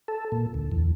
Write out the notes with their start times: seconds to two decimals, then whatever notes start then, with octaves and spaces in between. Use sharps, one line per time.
0.08 A4
0.32 A#2
0.54 D2
0.72 E2